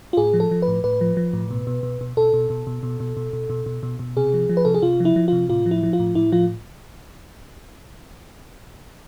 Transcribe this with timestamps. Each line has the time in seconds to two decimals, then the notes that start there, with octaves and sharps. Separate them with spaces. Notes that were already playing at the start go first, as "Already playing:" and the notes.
0.13 F4
0.17 A2 G#4
0.33 F3
0.40 A4
0.51 F3
0.62 B4
0.68 A2
0.84 A2 B4
1.01 F3
1.17 F3
1.33 A2
1.51 B2
1.67 B2
1.83 B2
2.01 B2
2.17 B2 A4
2.34 B2
2.50 B2
2.67 B2
2.83 B2
3.00 B2
3.17 B2
3.33 B2
3.50 B2
3.66 B2
3.83 B2
3.99 B2
4.17 C3 G#4
4.34 F3
4.49 F3
4.57 B4
4.65 C3 A4
4.74 G#4
4.82 C3 F4
5.00 F3
5.05 E4
5.16 F3
5.28 C3 F4
5.49 A2 F4
5.66 F3
5.71 E4
5.83 F3
5.93 F4
6.00 A2
6.15 A2 E4
6.32 F3 F4